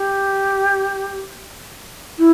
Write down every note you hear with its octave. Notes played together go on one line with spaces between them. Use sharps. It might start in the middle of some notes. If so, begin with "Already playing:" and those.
Already playing: G4
E4